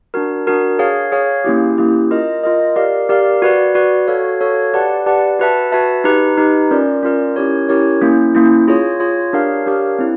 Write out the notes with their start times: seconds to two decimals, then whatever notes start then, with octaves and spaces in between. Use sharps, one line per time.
0.14 D4 F#4 A#4
0.47 D4 F#4 A#4
0.79 G#4 C#5 F5
1.12 G#4 C#5 F5
1.44 A#3 C#4 E4 G4
1.78 A#3 C#4 E4 G4
2.11 F4 A#4 D#5
2.44 F4 A#4 D#5
2.76 G4 A#4 D5 F5
3.09 G4 A#4 D5 F5
3.42 F#4 B4 D5
3.75 F#4 B4 D5
4.08 F#4 A4 C#5 F5
4.41 F#4 A4 C#5 F5
4.74 G4 B4 D5 F#5 A5
5.06 G4 B4 D5 F#5 A5
5.39 F#4 B4 E5 A5
5.72 F#4 B4 E5 A5
6.04 D#4 G4 B4
6.38 D#4 G4 B4
6.71 C#4 F4 A#4 D5
7.03 C#4 F4 A#4 D5
7.36 C#4 E4 G4 A#4 C#5
7.69 C#4 E4 G4 A#4 C#5
8.01 A#3 C#4 E4
8.35 A#3 C#4 E4
8.68 F4 G#4 C#5
9.00 F4 G#4 C#5
9.33 D4 G4 A#4 C#5 F5
9.66 D4 G4 A#4 C#5 F5
9.99 C4 E4